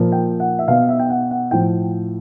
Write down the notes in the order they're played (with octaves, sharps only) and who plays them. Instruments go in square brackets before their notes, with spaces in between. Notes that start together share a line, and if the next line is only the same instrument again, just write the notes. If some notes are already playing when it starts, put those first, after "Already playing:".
Already playing: [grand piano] A#2 F3
G5
F#5
E5
B2 F5
E5
G5
F#5
F#5
A2 F3 G5